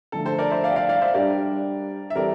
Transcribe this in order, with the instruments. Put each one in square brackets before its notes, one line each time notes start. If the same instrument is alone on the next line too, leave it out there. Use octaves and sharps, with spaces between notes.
[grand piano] D3 F3 A3 [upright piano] A4
[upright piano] A4 C5
A#4 D5
C5 E5
D5 F5
G5
D5 F5
D5 F5
C5 E5
[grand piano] G3 D4 G4 [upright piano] A#4 D5
[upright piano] E5
[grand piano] E3 G3 C4 E4 A4 [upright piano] A#4 D5